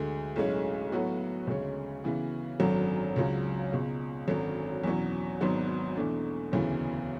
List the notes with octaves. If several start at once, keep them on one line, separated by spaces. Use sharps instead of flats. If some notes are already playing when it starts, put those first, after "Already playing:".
Already playing: D2 D3 G#3
B1 A2 G#3 C#4
A2 F#3 B3 F#4
D2 C#3 G#3 C#4
C#3 E3 B3
G#1 F#2 D3 F#3
C#2 C#3 F#3
C#2 B2 G#3
G#1 F#2 D3 F#3 C#4
E2 B2 F#3 C#4
G#1 G#2 F#3 B3
E2 B2 A3 D4
E1 D2 C#3 E3 B3